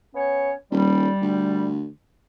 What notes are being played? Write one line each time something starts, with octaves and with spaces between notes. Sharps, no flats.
B3 C#4 C#5
D#1 G3
D2